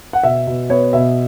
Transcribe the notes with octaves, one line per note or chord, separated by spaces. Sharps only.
F#5
B2 E5
B2
B3 C#5
B2 E5